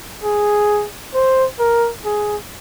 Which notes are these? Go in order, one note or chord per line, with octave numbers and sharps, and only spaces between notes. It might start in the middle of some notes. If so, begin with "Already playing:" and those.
G#4
C5
A#4
G#4